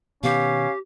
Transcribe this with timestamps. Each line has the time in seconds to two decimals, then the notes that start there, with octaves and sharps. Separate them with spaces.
0.23 B2 D#3 B3 C#4 G4 F5